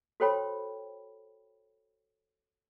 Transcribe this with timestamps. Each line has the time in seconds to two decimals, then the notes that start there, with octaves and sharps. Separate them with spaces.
0.20 F#4 A4 C5 C#5 G5 B5